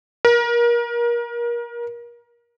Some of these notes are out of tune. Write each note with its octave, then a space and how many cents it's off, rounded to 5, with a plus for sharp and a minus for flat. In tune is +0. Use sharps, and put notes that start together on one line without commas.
A#4 +30